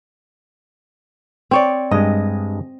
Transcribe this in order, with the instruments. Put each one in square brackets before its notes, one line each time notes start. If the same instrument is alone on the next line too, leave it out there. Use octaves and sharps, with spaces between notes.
[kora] C4 C#5 D5
[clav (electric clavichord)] G2 G#3 [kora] D#5